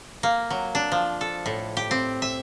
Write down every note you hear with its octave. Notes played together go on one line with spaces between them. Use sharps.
A#3
F#3
D4
F3
A4
A2
G4
C4
E5